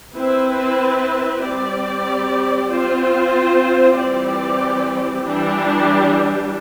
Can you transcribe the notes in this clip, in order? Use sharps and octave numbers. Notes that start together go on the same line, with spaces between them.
C4 E4 B4
G3 C4 G4 D5
C4 F4 C5
E3 G3 C4 G4 D5
E3 G3 D4 G4